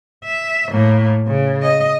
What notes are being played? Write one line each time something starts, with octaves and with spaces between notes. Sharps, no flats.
E5
A2 A#3
C#3
D#5